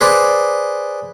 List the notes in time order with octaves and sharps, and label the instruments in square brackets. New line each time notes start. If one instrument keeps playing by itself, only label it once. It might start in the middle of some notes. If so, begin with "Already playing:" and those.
[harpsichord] G#4 B4 C5 D5